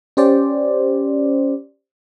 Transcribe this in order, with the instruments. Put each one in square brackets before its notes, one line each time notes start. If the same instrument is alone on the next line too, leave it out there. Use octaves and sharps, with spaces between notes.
[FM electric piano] C#4 G4 C5 D5